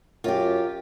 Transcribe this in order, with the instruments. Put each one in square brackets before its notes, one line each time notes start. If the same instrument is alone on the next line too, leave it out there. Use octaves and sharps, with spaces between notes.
[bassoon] F#2 [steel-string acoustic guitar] F4 G4